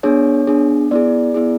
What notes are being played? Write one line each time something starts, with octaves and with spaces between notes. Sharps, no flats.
B3 D4 G#4 C#5
B3 D4 G#4
B3 E4 G#4 D5
B3 E4 G#4